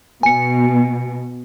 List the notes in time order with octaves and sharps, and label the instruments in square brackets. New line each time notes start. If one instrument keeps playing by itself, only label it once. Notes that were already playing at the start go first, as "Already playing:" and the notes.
[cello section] B2 [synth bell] G#5 C#7